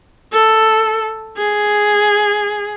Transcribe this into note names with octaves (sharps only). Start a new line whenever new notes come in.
A4
G#4